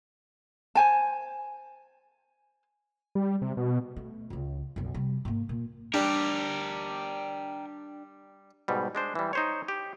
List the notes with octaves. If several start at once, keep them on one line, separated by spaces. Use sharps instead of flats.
C5 G#5 A5
G3
C3
B2
A3
C#2 C#3
B1 F#2
C3 G3
G#2 A#3
A#2
G3 D4 G4 A#4
G#2 B2 G3
G#3 D4 C5
E3 G3
D#4 C5 C#5
G4